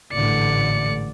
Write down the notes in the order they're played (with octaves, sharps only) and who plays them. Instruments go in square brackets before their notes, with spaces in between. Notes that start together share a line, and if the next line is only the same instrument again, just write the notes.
[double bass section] A1 G#2 D3 [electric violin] D5 C#7